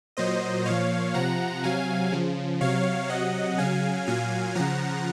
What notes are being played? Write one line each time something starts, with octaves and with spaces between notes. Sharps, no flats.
A#2 F#3 C5 D#5
A#2 F3 C#5 F5
C3 F3 F#5 A#5
C3 F#3 F5 G#5
C#3 F3
C3 F#3 C#5 F5
C3 F#3 D#5 F#5
C#3 F#3 F5 G#5
A#2 F#3 F5 G#5
C#3 F3 F#5 A#5